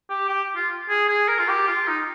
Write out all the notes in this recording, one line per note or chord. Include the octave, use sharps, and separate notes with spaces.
G4
G4
F4
G#4
G#4
A#4
F4
G4
F4
D#4